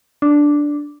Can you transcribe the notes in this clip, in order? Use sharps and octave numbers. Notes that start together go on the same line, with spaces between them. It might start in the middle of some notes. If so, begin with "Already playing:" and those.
D4